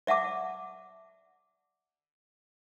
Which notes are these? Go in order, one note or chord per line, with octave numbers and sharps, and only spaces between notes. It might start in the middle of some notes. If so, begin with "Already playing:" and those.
D5 E5 F#5 A5 D6